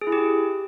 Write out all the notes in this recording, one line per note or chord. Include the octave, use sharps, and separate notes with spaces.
G#4
E4
G4